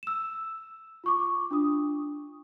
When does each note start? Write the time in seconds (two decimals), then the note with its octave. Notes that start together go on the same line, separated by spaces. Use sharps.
0.03 E6 E7
1.04 F4 C#6 D6
1.51 D4 F4 D#6